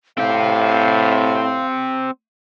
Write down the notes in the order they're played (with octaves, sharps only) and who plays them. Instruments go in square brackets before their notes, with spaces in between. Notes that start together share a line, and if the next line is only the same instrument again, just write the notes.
[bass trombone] A2 [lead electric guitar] C4 G4 [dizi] F5